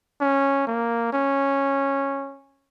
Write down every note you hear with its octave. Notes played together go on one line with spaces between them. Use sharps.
C#4
A#3
C#4